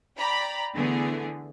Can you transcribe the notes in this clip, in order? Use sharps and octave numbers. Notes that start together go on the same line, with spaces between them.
D5 G5 A#5 B5
D3 E3 A3 B3 G#4